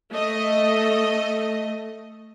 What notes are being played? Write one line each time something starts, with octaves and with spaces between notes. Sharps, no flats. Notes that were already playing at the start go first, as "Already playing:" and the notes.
A3 D#5